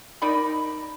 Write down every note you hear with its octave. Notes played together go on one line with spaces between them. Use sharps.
D#4 A#4 D5 B5